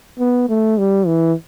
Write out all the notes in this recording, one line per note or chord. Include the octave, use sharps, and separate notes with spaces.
B3
A3
G3
E3